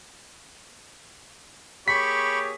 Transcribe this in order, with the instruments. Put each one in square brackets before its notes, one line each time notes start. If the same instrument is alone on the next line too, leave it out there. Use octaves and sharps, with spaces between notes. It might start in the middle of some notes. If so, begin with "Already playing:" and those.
[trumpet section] A#3 G#4 C#5 [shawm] G4 [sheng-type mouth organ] B5 C#6 [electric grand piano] B6